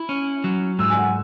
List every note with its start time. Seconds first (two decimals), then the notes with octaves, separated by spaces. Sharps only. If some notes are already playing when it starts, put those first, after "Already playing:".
Already playing: E4
0.09 C#4
0.44 F#3
0.79 G#2 E6
0.90 G#5
0.97 F#5